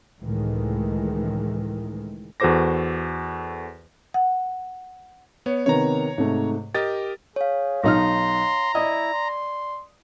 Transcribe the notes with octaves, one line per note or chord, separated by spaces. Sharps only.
C#2 A2 D#3 E3 G#3 A3
E2 F#4 A4 C5 D6 A#6
F#5
B3 C#5
C3 D#3 B3 C#5 A#5
G#2 C3 A3
G4 A#4 D#5 A6
G#4 C#5 F5
B1 D#4 A#5 C6 F6
E4 D5 D#5
C6